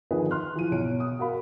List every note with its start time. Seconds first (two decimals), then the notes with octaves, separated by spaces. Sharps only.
0.11 D3 D#3 F3 D#4 G#4 B4
0.31 C6 F6 F#6
0.55 E3 F3 D#7
0.72 B1 C#5 D7
1.00 D#6
1.19 F#4 A#4 F5 B5